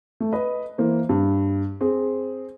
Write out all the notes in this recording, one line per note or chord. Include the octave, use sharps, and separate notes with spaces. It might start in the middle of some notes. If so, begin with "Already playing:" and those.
A3
B4 D#5
E3 A#3 C5
G2
C4 G#4